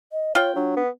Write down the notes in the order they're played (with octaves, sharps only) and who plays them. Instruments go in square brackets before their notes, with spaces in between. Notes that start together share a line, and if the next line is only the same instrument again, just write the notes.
[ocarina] D#5
[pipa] F4 G5 [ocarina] C#5
[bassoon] F#3 [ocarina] D4
[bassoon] B3